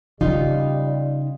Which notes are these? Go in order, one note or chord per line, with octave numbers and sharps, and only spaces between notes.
C#3 G3 D#4 F4